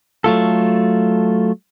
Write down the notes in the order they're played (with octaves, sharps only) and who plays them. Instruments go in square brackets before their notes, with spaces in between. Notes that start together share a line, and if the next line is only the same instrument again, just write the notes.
[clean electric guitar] F#3 A3 F4 A4